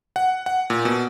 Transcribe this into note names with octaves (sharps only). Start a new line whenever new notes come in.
F#5
F#5
A#2
B2